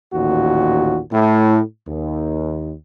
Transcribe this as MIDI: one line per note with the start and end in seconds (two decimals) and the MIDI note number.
0.14 1.00 33
0.14 1.00 39
0.14 1.00 46
0.14 1.00 66
1.12 1.61 45
1.88 2.74 39